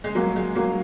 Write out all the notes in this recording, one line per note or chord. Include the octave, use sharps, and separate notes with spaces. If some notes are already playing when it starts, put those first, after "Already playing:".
G#3
F#3 A#3
G#3
F#3 A#3